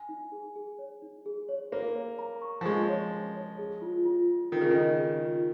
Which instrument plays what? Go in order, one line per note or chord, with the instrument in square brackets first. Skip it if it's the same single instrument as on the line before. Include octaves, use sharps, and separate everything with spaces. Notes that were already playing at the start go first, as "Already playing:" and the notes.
Already playing: [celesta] G#5
D#4
G#4
G#4
C#5
D#4
G#4
C#5
[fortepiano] A#3 [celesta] C#5
[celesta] C#5
A#5
C#6
[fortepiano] F3
[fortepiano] G#3 [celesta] C#6
[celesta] C#5
C#5
C#5
G#4
F4
F4
F4
[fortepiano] D#3 [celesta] F4
[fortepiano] C#3
[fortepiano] D#3 [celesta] D#5
[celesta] G#4
F4